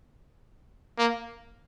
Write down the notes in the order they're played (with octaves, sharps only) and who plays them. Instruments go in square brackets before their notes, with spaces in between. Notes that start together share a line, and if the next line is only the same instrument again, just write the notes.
[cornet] A#3